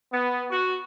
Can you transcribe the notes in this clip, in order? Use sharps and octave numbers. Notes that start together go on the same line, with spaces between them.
B3
F#4